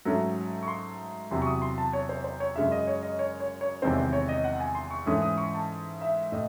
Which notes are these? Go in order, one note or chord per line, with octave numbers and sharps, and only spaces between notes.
G#2 F#3 A3 C#4
C#6
C6
E2 C3 F#3 C6
C#6
D#6
C6
A5
C#5
C5
C5
C#5
F#2 C#3 G#3 C#4 E5
D#5
C#5
D#5
C#5
C#5
C#5
E2 C3 D#3 G#3 C4 C5
C5
C#5
D#5
F#5
G#5
C6
C#6
G#2 E3 A3 C#4 D#6
D#6
C#6
A5
E5
A2 D#5